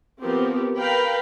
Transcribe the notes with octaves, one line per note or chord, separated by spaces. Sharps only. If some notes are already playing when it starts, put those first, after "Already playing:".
F3 B3 C4 G4 A#4
A#4 B4 F5 G5 A#5 B5